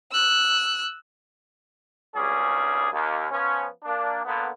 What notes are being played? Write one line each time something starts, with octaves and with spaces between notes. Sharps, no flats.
E6 F#6
G#1 C#2 G3 C#4 G#4
D#2
F3 B3 C#4
A#3 D4
A#2 D3 B3